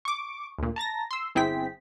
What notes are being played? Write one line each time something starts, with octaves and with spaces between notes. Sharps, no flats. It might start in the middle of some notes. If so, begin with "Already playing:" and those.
C#6 D6
D2 A#2
A5 A#5 A6 A#6
C6 E6
G1 C4 E4 G#4 G5 B6